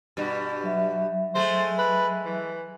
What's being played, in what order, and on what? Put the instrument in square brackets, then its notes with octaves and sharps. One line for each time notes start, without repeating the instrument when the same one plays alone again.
[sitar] G2 B2 G3
[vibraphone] F#3 E5
[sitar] G#3 A3 G#4 [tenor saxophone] C5
[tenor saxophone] B4
E3